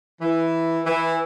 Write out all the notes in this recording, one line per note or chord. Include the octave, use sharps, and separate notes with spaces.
E3
E3